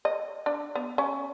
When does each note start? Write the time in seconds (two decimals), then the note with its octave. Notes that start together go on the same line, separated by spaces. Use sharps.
0.05 D#5
0.46 D4
0.75 B3
0.98 C#4